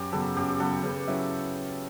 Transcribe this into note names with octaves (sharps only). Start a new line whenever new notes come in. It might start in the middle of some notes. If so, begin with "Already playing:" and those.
Already playing: F#2 G4 B4
C#3 F#3 B3 A4
F#2 G4
C#3 F#3 B3 A4
C#3 B4
F#3 C#4 E4